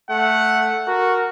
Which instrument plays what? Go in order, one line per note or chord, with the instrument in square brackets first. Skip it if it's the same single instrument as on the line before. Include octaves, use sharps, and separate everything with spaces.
[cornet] A3 [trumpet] F#5
[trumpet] F#4 [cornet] A#4